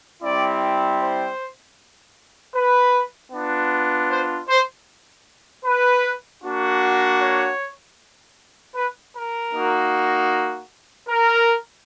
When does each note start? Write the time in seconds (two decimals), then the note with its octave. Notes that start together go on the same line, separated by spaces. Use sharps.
0.22 G3 C4 E4 D5
1.00 C5
2.55 B4
3.32 B3 D4 F4
4.10 C5
4.49 C5
5.65 B4
6.43 A#3 D4 F#4
7.20 C#5
8.76 B4
9.15 A#4
9.54 A#3 D#4 F#4
11.09 A#4